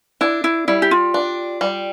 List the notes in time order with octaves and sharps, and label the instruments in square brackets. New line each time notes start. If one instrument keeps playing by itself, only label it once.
[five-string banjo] D4 [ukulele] E4
[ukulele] E4
[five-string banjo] G3 [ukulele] E4
[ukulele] G4
F4
[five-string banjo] D4
G3